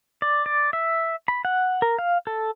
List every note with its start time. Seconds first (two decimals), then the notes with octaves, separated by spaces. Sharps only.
0.22 D5
0.46 D5
0.73 E5
1.28 B5
1.45 F#5
1.82 A#4
1.99 F5
2.27 A4